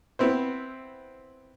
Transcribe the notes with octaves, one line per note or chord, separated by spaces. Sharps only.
B3 C4 E4 C5